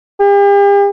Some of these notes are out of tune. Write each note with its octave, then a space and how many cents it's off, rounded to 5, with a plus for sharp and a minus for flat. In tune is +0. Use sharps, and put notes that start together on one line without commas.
G4 +45